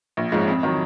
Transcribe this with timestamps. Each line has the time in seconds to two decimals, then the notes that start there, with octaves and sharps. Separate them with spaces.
0.17 A#1
0.32 G#2 F3 G#3 C#4
0.48 F2
0.63 D#3 F#3